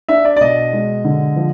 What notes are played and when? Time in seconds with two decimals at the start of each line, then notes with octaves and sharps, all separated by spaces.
0.09 D4 E5
0.25 D5
0.36 D5
0.41 B2 D#5
0.73 G#3
1.05 D3
1.36 F3